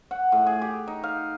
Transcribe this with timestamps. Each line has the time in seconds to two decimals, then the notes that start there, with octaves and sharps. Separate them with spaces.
0.11 F#5
0.32 A2
0.46 G#4
0.62 G4
0.88 D#4
1.04 F5